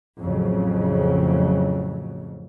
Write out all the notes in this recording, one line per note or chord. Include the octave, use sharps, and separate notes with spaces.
A1 F2 A2 C#3 F#3